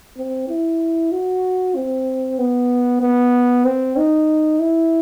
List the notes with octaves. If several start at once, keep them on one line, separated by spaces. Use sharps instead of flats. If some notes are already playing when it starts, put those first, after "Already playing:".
C4
E4
F#4
C4
B3
B3
C4
D#4
E4